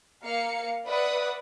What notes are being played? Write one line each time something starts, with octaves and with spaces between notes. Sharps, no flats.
A#3 F5 C#7
B4 D5 E5 F#5 D#6